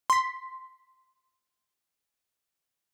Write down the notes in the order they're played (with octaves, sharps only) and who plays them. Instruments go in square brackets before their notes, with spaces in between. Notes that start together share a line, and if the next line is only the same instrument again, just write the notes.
[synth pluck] C6 B6